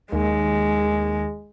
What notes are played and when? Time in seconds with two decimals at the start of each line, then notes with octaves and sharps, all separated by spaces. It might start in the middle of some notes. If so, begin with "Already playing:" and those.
0.12 D#2 G#3